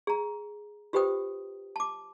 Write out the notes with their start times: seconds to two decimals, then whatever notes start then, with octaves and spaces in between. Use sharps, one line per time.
0.07 G#4 A#5
0.93 F4 G4 B4 C5 G5 D#6
1.76 A5 D6